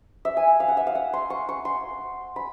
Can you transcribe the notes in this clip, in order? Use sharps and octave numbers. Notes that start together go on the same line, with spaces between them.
E5
G#5
F5
F#5
E5
F5
F#5
C6
C#6
C#6
C6
B5